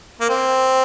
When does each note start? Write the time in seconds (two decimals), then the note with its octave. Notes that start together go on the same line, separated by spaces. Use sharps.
0.21 A#3
0.29 C4